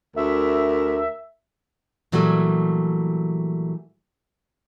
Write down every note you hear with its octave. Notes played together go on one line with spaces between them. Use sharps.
D2 A#4 E5
A#2 E3 F#3 G3 A3